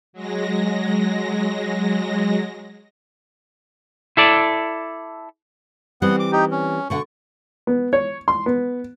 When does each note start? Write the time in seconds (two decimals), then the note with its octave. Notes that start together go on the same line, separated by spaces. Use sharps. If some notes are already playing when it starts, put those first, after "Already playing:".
0.13 F#3 G#3 A#6
4.17 E4 A4 D5
6.02 E3 G3 B3 C4 F#5
6.19 D6
6.32 D#4 G4
6.51 C#4
6.90 B2 D3 F#5 C#6
7.67 B3
7.93 C#5
8.28 C6
8.46 B3